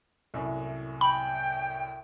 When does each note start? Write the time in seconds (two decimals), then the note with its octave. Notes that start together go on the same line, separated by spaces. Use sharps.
0.34 C2 F#2 A2
1.01 G5 B5